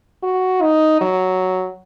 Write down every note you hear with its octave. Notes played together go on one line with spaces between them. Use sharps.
F#4
D#4
F#3